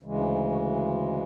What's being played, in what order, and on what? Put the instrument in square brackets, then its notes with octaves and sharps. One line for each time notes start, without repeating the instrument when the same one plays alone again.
[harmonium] D2 C#3 E3 G#3
D4
D#4
F#4